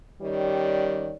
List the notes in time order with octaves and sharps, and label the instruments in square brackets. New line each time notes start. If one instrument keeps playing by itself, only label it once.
[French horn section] D#3 G3 C#4 G4 C#5 D5